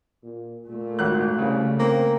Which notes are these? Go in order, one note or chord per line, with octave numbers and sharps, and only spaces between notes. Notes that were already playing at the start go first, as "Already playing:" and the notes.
A#2
A#2 A3
G#1 F#6
C2 C#3
A#3 C4